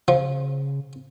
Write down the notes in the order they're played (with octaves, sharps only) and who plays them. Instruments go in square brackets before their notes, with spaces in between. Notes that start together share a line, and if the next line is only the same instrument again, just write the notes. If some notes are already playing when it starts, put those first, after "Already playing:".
[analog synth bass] C#3 [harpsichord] F3